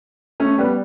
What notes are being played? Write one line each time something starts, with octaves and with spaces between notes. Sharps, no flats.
A3 C#4
G3 B3